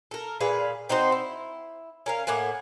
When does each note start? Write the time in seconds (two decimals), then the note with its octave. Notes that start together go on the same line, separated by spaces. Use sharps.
0.11 A4 A#4
0.40 A#2 G#4 B4 F5
0.89 C4 D#4 F#4 C5
1.12 E4
2.06 C#4 A#4 F5
2.27 A2 A#3 F#5 G#5